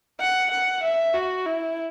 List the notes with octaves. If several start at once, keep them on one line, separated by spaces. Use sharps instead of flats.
F#5
F#5
E5
F#4
E4